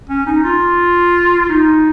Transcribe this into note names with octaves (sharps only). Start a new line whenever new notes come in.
C#4
D#4
F4
D#4